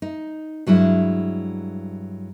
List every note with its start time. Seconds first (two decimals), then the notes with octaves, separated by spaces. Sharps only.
0.02 D#4
0.67 G2 F#3 G#3 E4